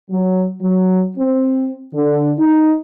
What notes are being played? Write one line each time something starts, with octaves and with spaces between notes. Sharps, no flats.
F#3
F#3
C4
D3
D#4